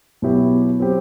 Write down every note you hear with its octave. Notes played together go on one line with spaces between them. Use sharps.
B2 F#3 B3 E4 G4
F#3 C4 G4